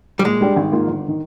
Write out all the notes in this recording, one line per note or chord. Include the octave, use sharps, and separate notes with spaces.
G3
A#2 G#3
G3 D4 G4
G#1
G#2 D#3 A#3 F4
G1
D#3